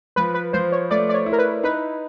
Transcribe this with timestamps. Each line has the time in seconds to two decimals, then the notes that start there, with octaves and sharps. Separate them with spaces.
0.16 F3 B4
0.34 B4
0.53 F3 C5
0.72 C#5
0.91 A3 D5
1.09 D5
1.14 C#5
1.26 E4
1.33 A#4
1.39 B4
1.63 D#4 B4